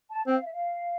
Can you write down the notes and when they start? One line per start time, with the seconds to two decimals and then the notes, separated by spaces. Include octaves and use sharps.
0.10 A5
0.27 C4 G5
0.35 F5
0.44 E5
0.53 F5